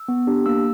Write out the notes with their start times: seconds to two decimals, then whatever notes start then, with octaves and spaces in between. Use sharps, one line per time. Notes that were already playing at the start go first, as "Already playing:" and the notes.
Already playing: E6
0.08 B3
0.27 D4 G4
0.46 A#3 E6